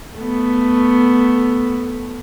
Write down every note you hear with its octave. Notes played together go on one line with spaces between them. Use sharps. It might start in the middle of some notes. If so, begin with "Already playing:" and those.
A3 B3